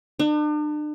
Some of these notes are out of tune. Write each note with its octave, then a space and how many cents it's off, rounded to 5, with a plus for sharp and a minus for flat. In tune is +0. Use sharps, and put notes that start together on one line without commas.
D4 +40